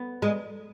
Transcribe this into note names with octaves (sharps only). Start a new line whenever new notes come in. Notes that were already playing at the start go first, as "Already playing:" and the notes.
Already playing: B3
G#3